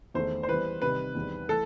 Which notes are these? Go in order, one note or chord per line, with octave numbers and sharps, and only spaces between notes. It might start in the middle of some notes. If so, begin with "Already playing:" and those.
E2 D#3 A3 D#4 C5
C5
E3 G3 B3 B4
C3 D#3 G3 D#4 B4
E2 D#3 G3 C4
E3 A3 E4 A4